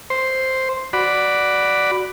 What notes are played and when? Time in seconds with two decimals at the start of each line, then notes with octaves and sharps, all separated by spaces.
0.10 C5
0.93 F#4 D5 B5